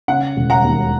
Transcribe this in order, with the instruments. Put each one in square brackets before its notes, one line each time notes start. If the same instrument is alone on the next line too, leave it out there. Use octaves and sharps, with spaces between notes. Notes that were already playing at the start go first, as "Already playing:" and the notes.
[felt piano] C#3 [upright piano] F#5
[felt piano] E1
[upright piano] F#5 A#5
[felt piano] D#2